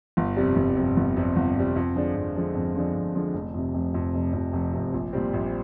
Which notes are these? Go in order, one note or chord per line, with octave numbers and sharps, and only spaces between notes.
G1
F2 C3 G3
G1
F2 C3 G3
G1
F2 C3 G3
G1
F2 C3 G3
F2
D3 F3 G#3 D4
F2
D3 F3 G#3 D4
F2
D3 F3 G#3 D4
F2
D3 F3 G#3 D4
F1
F2 C3
F1
F2 C3
F1
F2 C3
F1
F2 C3
A#1
A#2 G3 C4
A#1